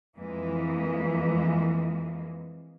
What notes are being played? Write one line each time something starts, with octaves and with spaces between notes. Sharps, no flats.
F2 E3 G#3 A#3